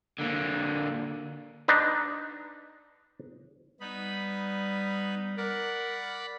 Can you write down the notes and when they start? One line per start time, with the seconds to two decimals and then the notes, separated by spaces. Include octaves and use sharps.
0.19 D3 A#3
1.68 D4 D#4 B4
3.80 G3 B3 D#4 B5
5.37 A#4 D5 F#5 B5